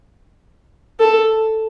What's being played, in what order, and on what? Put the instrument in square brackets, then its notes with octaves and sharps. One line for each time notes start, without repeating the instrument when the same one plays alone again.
[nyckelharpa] A4